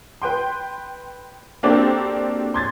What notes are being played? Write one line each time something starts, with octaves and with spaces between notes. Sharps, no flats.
B4 G5 C6
A#3 C4 D4 F#4 G4 A4
C6 G#6 A6